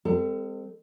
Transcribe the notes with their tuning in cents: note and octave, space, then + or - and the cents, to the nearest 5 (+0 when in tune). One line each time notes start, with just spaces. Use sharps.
G#3 -35 C4 -15 A4 +35